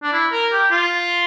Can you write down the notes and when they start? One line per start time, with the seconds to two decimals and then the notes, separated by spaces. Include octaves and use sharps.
0.03 D4
0.13 E4
0.32 A#4
0.52 G4
0.71 F4